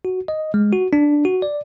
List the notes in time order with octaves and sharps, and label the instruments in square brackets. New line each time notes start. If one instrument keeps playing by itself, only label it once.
[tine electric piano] F#4
D#5
G#3
F#4
D4
F#4
D5